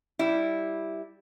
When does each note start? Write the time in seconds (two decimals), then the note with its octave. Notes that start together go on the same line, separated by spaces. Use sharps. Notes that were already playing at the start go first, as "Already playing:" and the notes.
0.19 G3 E4